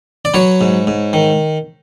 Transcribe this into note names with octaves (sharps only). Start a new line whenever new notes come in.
D5
F#3 B4 C#5
G#2
G#2
D#3